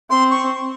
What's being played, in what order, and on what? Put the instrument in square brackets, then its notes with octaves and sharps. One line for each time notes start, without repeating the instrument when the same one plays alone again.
[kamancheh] C4 [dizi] C6
[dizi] C#6